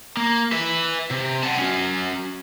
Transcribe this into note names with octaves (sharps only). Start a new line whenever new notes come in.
A#3
B4 E5
C3
F#5 A5
C#4 F#4